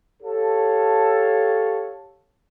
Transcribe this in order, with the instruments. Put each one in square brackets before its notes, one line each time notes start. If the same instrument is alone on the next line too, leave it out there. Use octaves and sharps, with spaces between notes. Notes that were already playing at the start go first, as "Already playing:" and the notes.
[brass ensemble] G4 A4 C#5 F5 A5